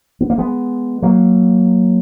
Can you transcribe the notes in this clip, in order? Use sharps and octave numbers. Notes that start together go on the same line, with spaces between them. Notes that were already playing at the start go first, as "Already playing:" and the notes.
B3
A#3
G#3 B3
F#3 A#3